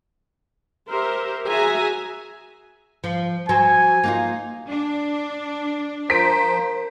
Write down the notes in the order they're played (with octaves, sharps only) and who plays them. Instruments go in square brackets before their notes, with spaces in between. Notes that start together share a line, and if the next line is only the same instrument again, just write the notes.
[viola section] G4 A#4 C5 E5
F#4 G#4 E5 G#5 A#5
[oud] F3
[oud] F#3 C5 [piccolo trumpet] G#5
[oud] A#3 D#4 F4
[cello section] D4
[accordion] F3 C5 [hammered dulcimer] A#4 [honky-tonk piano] B6 D7